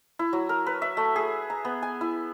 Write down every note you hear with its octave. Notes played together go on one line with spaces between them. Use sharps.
E4
F#3
A#4
B4
E5
A3
G#4
A#5
B3
G#5
E4